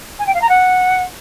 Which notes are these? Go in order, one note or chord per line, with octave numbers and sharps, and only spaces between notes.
G#5
G5
F5
A#5
F#5